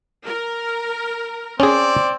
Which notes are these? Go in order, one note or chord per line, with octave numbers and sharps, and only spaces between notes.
A#4
C4 C#4 G#4 D5